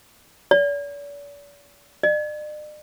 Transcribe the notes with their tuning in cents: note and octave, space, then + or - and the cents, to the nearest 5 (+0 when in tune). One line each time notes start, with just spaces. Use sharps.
D5 -45
D5 +45